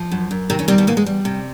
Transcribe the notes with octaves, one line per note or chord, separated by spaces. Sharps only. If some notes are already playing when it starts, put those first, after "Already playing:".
Already playing: F3
F#2
F#2
C3 D#3 C4
C#3 C#4
C3 G3 C4
B2 B3
E2 A#2 A#3
G#3
G3
C3